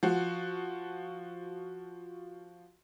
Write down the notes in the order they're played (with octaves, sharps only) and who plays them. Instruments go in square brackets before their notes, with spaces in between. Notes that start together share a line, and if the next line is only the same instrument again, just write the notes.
[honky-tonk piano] F3 F#4